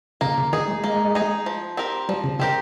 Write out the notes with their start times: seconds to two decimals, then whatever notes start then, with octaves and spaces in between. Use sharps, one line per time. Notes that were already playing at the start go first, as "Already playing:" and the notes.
0.21 C#3 A#3
0.38 C#3
0.53 D#3 D#4 G#4
0.68 G#3
0.84 G#3 A#3
1.15 D#4 G#4
1.46 F3
1.77 C4 G4 A#4
2.09 F3 G3
2.24 C#3
2.39 C#3 C4 G4 A#4